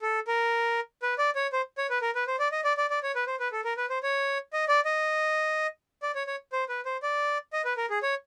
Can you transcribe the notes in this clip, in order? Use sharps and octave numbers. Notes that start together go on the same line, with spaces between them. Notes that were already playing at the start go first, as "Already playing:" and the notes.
A4
A#4
B4
D5
C#5
C5
C#5
B4
A#4
B4
C5
D5
D#5
D5
D5
D5
C#5
B4
C5
B4
A4
A#4
B4
C5
C#5
D#5
D5
D#5
D5
C#5
C#5
C5
B4
C5
D5
D#5
B4
A#4
G#4
C#5